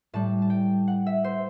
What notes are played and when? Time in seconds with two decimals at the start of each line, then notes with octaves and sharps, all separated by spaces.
0.13 A2 G3 A5
0.42 A5
0.50 G5
0.88 F#5
1.06 E5
1.24 C5